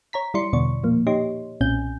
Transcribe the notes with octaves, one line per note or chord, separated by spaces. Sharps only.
C#5 A#5 B6
G3 E4 D5 C6 C#7
E2 B2 D3 D5 C#6
A#2 F3 A#3
D#4 G4 C#5 D#5 C6
B1 A#2 C4 C#4 G#5 G6